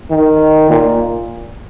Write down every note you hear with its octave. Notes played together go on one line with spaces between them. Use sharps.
D#3
A#2